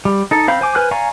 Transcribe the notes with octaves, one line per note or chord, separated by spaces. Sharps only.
G3
D#4 A4
C4 C5 F5 B5 G6
C5 G#5 D6
B4 C5 G#5 F6 F#6
D5 F5 G#5 A#5 C#6